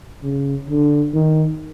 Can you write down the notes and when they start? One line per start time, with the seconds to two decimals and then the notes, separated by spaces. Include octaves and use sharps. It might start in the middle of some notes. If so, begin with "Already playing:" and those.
0.23 C#3
0.69 D3
1.14 D#3